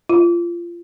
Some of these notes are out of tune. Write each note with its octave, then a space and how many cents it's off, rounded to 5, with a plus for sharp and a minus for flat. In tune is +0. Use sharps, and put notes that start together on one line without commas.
F4 -25